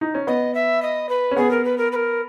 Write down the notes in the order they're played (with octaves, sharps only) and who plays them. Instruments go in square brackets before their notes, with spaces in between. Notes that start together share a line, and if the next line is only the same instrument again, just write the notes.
[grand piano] D#4
C#4
[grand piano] B3 [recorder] D#5
[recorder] E5
D#5
B4
[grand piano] C#4
[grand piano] B3 [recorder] G#4
[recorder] A#4
B4
A#4
B4
A#4